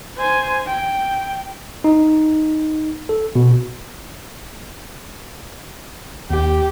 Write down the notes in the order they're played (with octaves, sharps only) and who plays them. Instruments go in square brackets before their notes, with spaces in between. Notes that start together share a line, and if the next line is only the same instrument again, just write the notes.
[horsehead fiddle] C5 G#5
G5
[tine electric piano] D#4
A4
B2
[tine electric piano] D#2 [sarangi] G4